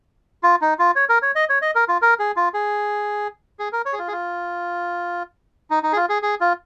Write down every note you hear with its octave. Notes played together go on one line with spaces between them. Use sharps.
F4
D#4
F4
C#5
A#4
C#5
D#5
C#5
D#5
A#4
F4
A#4
G#4
F4
G#4
G#4
A#4
C#5
G#4
F4
G#4
F4
D#4
D#4
G#4
F4
G#4
G#4
F4